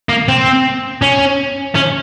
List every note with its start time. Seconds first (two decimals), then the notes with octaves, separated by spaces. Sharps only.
0.09 A#3
0.28 C4
1.02 C#4
1.75 C#4